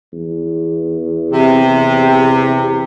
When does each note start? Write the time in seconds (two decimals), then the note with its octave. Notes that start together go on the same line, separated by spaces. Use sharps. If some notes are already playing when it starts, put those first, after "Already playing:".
0.13 E2
1.33 C3